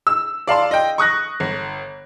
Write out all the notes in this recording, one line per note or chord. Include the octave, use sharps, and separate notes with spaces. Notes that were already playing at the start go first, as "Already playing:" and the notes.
E6
D5 F5 A5 C6
D#5 G5
C#6 D#6 F#6 A#6
G1